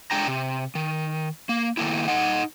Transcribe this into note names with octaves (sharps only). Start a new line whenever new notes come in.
G#3 D4 G5 A#5
C3
D#3
A#3
D#3 A3 A#3 E4
D#4 D#5 F#5